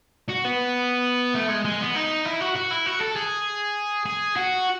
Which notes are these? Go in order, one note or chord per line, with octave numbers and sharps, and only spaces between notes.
F#4
B3
A3
G#3
G#3
B3
D#4
E4
F#4
F#4
E4
F#4
A4
G#4
G#4
F#4